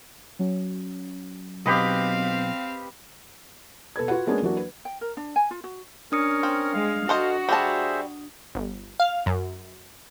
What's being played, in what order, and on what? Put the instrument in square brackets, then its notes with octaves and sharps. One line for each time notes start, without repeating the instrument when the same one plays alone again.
[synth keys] F#3 C#4
[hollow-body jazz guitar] B1 [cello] C4 F5 [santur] G4 B4 D#5
[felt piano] B2 A4 B4 G#6
F4 F#4 B4 F#5
G#3 A#3 B3 C#4 D4 G#4
E3 F#3 A#3 D4 F#4
B4
[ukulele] G5
A#4
D4
G#5
F4
F#4
[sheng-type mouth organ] C#4 A#4 [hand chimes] D4 D#6 C#7
[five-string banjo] C4
[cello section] G#3 [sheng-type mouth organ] F5
[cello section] F#4 [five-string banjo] A4 C5 D#5
[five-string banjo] G3 A5 [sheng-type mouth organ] G#4 C5 E5
[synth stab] G1
F5
F#2